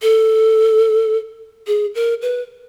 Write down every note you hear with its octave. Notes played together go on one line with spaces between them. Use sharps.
A4
G#4
A#4
B4